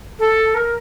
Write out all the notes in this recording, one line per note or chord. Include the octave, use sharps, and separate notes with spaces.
A4
A#4